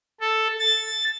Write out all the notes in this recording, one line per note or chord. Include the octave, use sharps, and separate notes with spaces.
A4
A6